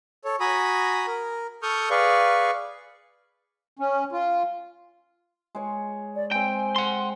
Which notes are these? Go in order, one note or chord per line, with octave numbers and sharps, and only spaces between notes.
A4 C#5
F#4 G#5 A#5 B5 D#6
A#4
A4 C#6 D#6 F6 G6
G#4 B4 D5 F5 C#6
C#4
F4
G#3 C#5
D5
G#3 C4 G5 G#5
F#5 C6